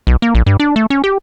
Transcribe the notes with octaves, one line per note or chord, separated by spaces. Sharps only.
B1
A#3
A#1
G2
D4
A3
C#4
G4